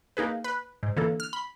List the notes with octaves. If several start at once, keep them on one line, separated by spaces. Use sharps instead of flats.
A#3 D#4 G#4 B4
B4
G#2
D3 E3 A#3 A4
F6
B5